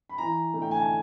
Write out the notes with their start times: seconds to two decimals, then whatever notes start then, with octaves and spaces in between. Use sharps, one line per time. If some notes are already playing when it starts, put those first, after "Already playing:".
0.09 B5
0.18 E3 A#5
0.54 A3 D4
0.62 G5
0.71 G#5
0.80 A5